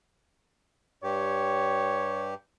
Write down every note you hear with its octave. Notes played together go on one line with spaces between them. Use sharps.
G2 G4 C#5